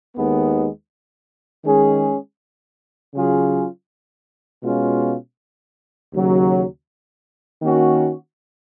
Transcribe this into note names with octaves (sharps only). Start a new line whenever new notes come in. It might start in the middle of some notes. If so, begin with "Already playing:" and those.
D#2 D#3 G#3 B3
D#3 G#3 C#4 G#4
C#3 F#3 C#4 F4 G#4
B2 G#3 C#4 F4
D#2 C#3 F#3
D#3 A#3 C#4 F#4